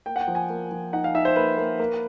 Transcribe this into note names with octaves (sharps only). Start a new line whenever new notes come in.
A#3 G5
F#5
G5
F3
G#5
A#3
F3
D#4 F#5
F5
D#4 E5
C5
A#3 B4
A#3
A#3